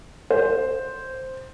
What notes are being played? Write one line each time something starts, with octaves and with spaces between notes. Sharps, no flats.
C5